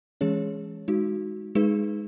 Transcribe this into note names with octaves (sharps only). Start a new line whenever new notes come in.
E3 G#3 C#4 G#4 C#5
G#3 D#4 F#4
G#3 D#4 G#4 B4